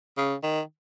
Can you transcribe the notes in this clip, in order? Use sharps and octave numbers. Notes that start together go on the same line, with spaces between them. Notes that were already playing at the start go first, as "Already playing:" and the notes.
C#3
D#3